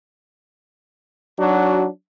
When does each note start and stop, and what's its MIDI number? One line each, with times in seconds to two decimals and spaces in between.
1.39 1.86 54
1.39 1.86 62
1.39 1.86 63
1.39 1.86 66